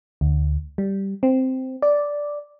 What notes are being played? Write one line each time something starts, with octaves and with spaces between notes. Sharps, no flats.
D2
G3
C4
D5